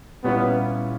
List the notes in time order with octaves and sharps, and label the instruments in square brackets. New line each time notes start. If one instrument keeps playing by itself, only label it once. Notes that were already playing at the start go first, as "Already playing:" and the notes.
[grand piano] A#2 G3 C#4 E4 [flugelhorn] B3